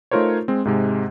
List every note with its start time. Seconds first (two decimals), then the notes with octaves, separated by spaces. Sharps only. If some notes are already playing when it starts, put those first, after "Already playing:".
0.11 A3 D#4 F4 A#4 C5 C#5
0.48 G#3 C4
0.65 G#2 C3 G#3